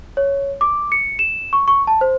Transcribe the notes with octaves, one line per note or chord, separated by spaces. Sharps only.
C#5
D6
C#7
E7
C#6
C#6
A5
C5